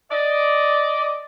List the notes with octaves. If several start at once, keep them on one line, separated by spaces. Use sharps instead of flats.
D5 D#5